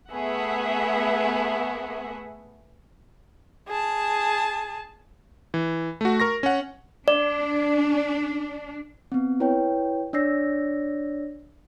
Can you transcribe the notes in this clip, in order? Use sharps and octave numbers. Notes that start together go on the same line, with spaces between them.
A3 B3 G#4 E5 F#5
G#4 A5
E3
A3 F#4
A#4 C#6 A#6
C#4 F#5
D4 D5
B3 C4
E4 B4 C#5 G5
D4 C#5 D5 E6 A#6 C7